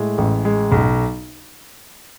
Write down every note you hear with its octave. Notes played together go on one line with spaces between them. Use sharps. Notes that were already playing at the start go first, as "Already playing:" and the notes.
Already playing: A2 G#3
A1
G#3
B1